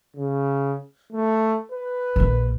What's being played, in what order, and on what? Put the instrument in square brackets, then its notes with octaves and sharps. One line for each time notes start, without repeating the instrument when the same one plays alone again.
[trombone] C#3
A3
B4
[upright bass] A#1 A#3